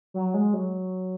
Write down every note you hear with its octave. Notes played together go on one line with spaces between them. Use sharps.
F#3
G#3
F#3